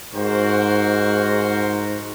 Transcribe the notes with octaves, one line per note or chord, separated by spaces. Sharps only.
G#2 F#4 A#4 C5